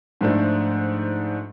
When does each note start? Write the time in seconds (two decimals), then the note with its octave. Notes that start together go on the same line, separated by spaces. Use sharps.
0.21 G#2 F3 A3 D4